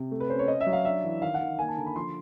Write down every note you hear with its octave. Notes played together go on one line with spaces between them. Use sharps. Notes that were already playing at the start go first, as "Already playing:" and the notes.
Already playing: C3
A3
B4
C#4 C5
C#5
C#4 D#5
E5
F#3
F5
D4 E5
E3
D#3 F5
F#5
D#3
A#3 G#5
A5
D3 A#5
B5
F3 C6